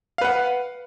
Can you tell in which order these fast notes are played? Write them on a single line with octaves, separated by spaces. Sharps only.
F5 B4 F#5